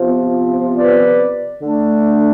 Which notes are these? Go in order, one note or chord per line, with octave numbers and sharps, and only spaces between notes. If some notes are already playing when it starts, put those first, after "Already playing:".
Already playing: C3 F3 B3 F4
B4 D5
D3 A3 D4